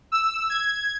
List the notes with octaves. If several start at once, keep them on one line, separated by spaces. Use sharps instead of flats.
E6
G#6